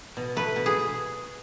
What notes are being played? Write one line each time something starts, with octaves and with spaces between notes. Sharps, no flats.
B2
A3 B4
B2
G#4